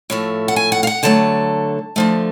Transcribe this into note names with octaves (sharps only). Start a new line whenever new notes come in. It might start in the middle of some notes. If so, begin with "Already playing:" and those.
A2 F3 A3
F#5
G#5
F#5
F5
F#5
D3 F#3 A3 A5
D3 F3 A3